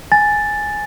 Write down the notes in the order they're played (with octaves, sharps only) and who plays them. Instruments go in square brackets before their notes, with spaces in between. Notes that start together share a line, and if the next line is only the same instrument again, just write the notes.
[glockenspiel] G#5 A6